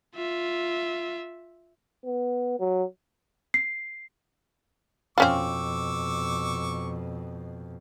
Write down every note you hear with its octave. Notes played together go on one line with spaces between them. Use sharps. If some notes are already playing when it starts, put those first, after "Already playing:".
F4 E5
B3
F#3
C7
F2 B2 C4 C#4 F4 C#6 D6 E6